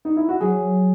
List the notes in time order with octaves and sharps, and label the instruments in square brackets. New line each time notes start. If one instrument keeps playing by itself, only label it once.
[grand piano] D#4
E4
F#4
[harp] F#3 [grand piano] G#4